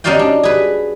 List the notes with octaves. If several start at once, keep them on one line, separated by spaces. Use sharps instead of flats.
C#4 D#4 F#4 D5 F5 G5
D4
G#4 B4